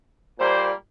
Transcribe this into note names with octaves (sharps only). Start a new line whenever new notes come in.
A#2 G3 A#3 C5